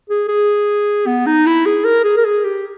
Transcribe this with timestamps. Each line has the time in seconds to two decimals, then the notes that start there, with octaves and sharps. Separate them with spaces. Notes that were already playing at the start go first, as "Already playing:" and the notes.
0.10 G#4
0.29 G#4
1.07 B3
1.26 D#4
1.46 E4
1.66 G#4
1.85 A#4
2.04 G#4
2.17 A#4
2.25 G#4
2.44 G4